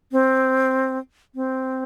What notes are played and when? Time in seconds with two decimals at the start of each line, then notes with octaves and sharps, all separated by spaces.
0.12 C4
1.35 C4